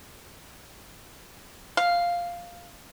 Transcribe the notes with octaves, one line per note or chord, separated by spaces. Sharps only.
F5